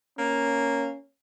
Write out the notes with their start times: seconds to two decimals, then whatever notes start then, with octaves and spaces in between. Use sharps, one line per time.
0.18 A#3 C#4